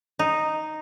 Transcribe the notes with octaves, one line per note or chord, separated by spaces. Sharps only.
D#4